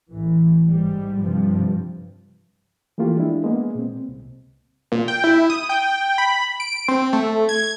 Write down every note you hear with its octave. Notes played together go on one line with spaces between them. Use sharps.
A1 E3
G#2 G3
G2 C3 F3
E3 F3 A3 A#3 F4 G4
G#3 D4 E4
G#3 A#3 B3
A#2 C4
C2
A#2
G5
E4
D#6
G5
B5
D7
C4
A3
G#6